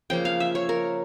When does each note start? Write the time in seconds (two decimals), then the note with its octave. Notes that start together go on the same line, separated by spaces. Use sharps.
0.10 C#3 F3 A#3 G5
0.25 F5
0.40 E5
0.55 C#5
0.69 A#4